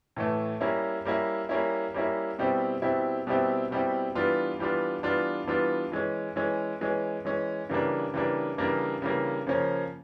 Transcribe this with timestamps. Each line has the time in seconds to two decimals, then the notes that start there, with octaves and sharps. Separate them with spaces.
0.16 A2 E3 A3
0.61 G3 A#3 C#4 E4
1.05 G3 A#3 C#4 E4
1.49 G3 A#3 C#4 E4
1.94 G3 A#3 C#4 E4
2.39 B2 G3 C4 E4 G4
2.82 B2 G3 C4 E4 G4
3.27 B2 G3 C4 E4 G4
3.71 B2 G3 C4 E4 G4
4.15 E3 G3 B3 D4 F4
4.59 E3 G3 B3 D4 F4
5.03 E3 G3 B3 D4 F4
5.47 E3 G3 B3 D4 F4
5.92 E3 G#3 C#4
6.36 E3 G#3 C#4
6.81 E3 G#3 C#4
7.25 E3 G#3 C#4
7.69 C#3 E3 G3 A#3 D4
8.14 C#3 E3 G3 A#3 D4
8.58 C#3 E3 G3 A#3 D4
9.02 C#3 E3 G3 A#3 D4
9.47 C#3 F3 A#3 C#4